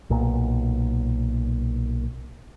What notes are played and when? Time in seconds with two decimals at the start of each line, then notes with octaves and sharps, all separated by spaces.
0.10 B1 A#2